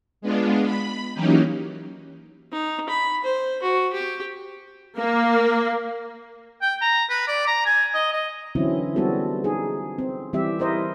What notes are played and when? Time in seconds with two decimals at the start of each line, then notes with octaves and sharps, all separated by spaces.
0.21 G#3 B3 D4 F4
0.64 B5
1.14 E3 F#3 A#3 C#4 D#4 G4
2.52 D#4
2.89 B5
3.24 C5
3.63 F#4
3.93 G4
4.97 A#3
6.62 G5
6.82 A#5
7.10 B4
7.28 D5
7.47 A#5
7.66 G#5
7.94 D#5
8.13 D#5
8.55 D3 E3 F#3 C4 C#4 E4
8.96 G3 G#3 B3 C4 F#4 A4
9.44 D#4 G#4
9.98 C4
10.33 E3 G3 C4 G4 E5
10.59 E4 A#4 C5 D#5